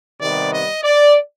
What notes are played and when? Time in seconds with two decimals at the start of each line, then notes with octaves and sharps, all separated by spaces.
0.20 C3 D#3 G3 B3 D5
0.53 D#5
0.84 D5